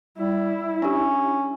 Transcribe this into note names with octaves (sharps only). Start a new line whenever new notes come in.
G3 E4
C#4 D4 G4